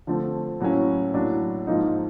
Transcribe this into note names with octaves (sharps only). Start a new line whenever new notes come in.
D3 F3 A3 C4
A2 F#3 A#3 C#4
A2 F#3 A#3 D4
G#2 F3 A#3 D#4